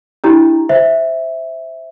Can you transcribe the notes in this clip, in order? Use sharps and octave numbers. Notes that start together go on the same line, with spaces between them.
D4 E4 G4 A#5
C5 E5